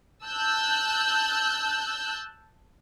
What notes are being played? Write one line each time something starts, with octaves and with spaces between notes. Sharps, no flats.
A5 E6 F#6 G6